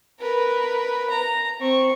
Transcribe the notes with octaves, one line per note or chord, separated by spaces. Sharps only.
A#4 B4
A#5
C4 C#6